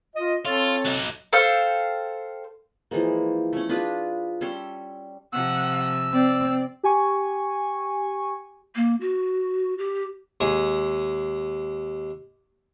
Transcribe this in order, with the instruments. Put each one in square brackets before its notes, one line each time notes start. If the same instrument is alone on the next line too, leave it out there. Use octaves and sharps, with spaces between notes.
[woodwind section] F4 D#5
[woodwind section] C4 A4 C#5 [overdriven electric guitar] F4
[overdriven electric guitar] F#3 D#4
[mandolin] A4 C5 F5 G5
[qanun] E3 F3 G#3 A#3
A3 C#4
D4 F4 G#4 B4
G3 C#4 A4 C6
[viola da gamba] C3 F3 [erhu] F#5 [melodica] E6
[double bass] C4 [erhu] D5
[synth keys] G4 G#5 C#6
[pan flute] A#3
F#4
G4
[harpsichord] D#2 G#3 G#4